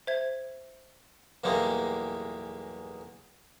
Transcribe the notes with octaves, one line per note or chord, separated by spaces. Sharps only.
C5 E5 G#6
B1 E2 A2 G3 G#3 A#3